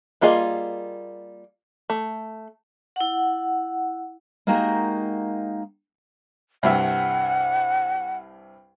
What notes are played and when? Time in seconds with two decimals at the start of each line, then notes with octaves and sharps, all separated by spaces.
0.21 G3 A#3 F4 G#4 D#5
1.90 A3
2.96 E4 F#5
4.47 G#3 A#3 D#4 F#4 G4 A#4
6.63 C2 G2 E5 F#5